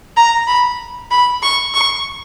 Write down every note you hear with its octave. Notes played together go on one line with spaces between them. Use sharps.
A#5
B5
B5
C#6
C#6